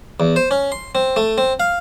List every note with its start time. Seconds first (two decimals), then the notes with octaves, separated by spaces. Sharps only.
0.20 E2
0.36 C5
0.51 C#4
0.72 C6
0.95 C4
1.16 A3
1.38 C4
1.60 F5